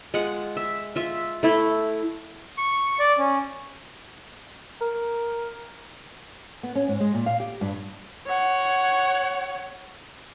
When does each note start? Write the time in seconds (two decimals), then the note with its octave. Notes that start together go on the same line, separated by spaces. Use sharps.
0.14 G#3 F4 F#5
0.57 E5
0.96 F4 E5
1.43 A3 E4
2.58 C#6
2.99 D5
3.18 C#4
4.81 A#4
6.63 B3
6.75 C#4
6.88 G#2
7.00 G#3
7.14 A#2
7.26 F5
7.40 G4
7.61 G2
8.26 C#5 F#5